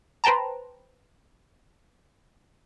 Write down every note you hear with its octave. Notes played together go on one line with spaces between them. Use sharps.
B4 C5 G5 A5 A#5